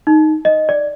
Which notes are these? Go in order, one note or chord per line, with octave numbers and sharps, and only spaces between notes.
D#4
D#5
D5